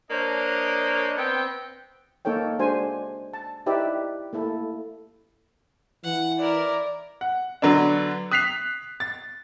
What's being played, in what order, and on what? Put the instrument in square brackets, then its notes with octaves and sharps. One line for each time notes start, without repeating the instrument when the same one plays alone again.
[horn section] A#3 D4 C5 C#5 D#5
B3 C4 G5
[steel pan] A#3 D#4 A4 C#5 G5
G#3 D4 F#4 C5 G#5
A5
D#4 E4 G4 B4 D5 E5
A3 A#3 E4 A4
[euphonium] E3 [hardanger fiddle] F#5
[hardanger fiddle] E4 A#4 [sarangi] D5
[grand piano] F#5
D3 F#3 B3 D4
D#6 F#6 B6 C7 F7
A6